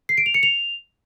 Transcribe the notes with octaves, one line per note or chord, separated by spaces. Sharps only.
C7
D7
F7
C#7
F7